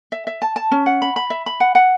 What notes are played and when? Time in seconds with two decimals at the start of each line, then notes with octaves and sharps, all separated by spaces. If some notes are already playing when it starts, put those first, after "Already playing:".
0.12 E5
0.27 E5
0.42 A5
0.56 A5
0.71 C#4
0.86 F#5
1.02 B5
1.16 B5
1.30 E5
1.46 B5
1.60 F#5
1.75 F#5